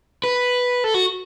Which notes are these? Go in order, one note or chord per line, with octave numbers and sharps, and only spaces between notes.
B4
A4
F#4